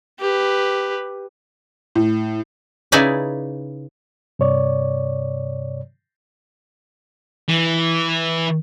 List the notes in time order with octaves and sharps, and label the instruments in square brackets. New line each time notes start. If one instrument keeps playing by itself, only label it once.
[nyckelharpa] G4 B4
[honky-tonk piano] A2
[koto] C#3 D#4 E4 B4 D5 G#5
[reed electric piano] G2 C3 C#5 D5
[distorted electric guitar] E3